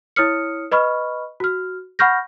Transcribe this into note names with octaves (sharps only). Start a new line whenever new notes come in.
E4 C#5 D#6 F6 C#7
B4 D#5 B5 C#6 F6
F#4 F6
F#5 B5 C#6 F6 G6 A#6